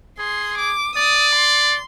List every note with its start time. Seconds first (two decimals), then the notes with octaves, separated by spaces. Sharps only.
0.19 G#4 C6
0.58 D6
0.95 D5 D#6
1.35 C6